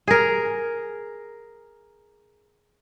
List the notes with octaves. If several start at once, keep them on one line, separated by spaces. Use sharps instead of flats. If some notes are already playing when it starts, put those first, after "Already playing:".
G#4 A#4